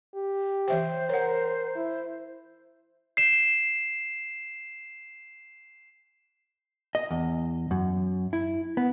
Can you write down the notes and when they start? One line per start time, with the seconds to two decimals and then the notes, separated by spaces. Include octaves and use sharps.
0.15 G4
0.68 E3 C5 E5 G5
1.09 A#4 C#5 F#5
1.76 E4
3.17 C7 E7
6.95 D#5
7.11 E2
7.71 F#2
8.33 E4
8.77 B3